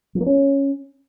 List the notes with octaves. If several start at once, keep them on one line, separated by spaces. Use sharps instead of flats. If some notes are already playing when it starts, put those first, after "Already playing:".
F3
A#3
C#4